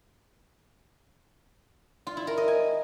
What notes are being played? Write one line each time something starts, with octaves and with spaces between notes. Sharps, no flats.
F4
E4
A#4
D#5
G#5